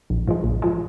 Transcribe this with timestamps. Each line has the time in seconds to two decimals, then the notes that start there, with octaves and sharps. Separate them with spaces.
0.10 A#1
0.27 G#2 F3 G#3
0.44 A#1
0.62 F3 G#3